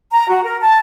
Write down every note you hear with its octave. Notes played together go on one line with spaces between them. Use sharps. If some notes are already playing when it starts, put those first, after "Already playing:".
A#5
F#4
A#4
A5